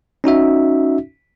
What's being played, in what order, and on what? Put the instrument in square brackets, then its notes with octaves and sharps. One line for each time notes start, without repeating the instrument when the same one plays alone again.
[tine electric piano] C#4 D#4 F#4 E5